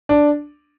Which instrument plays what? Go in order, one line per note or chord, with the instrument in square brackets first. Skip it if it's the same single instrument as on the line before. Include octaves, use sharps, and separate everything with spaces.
[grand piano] D4